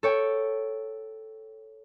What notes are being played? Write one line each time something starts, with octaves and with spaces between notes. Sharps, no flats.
A4 C#5 G5